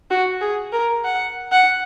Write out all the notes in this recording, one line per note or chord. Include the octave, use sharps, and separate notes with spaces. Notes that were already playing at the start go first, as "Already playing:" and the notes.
F#4
G#4
A#4
F#5
F#5